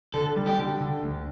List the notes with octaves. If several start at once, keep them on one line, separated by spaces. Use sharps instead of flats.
D3 A4
G3
G4
D3
D3
D2